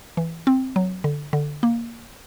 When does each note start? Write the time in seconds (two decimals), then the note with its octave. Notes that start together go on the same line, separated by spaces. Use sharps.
0.17 E3
0.47 C4
0.76 F#3
1.04 D3
1.33 D3
1.63 A#3